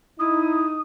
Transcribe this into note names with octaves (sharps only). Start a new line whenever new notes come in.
D#4 E4 D#6